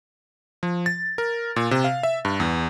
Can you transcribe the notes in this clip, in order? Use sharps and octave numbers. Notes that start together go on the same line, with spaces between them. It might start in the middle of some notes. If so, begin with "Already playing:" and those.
F3
A6
A#4
A#2
C3
F5
E5
G2
E2